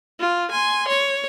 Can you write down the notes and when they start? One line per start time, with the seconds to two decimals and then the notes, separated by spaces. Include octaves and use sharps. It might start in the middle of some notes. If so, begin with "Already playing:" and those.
0.20 F4
0.51 G#5 C6
0.88 C#5